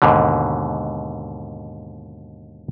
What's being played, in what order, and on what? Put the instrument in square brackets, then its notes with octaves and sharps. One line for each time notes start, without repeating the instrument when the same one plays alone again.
[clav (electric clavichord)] D#2 G#2 B2 D3